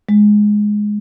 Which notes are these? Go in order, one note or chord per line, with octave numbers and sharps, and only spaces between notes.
G#3